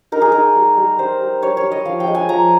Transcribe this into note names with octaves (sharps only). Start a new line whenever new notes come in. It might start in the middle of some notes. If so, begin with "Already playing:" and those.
D#4 A#4
G#4
D#4 A#4
G3
G3
G3 C5
G3
G3 C#5
C#5
G3
D#5
F3 F5
G5
G#3
G#5
F3 A#5